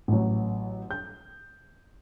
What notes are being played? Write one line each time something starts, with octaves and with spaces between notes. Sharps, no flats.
A1 F#3
G6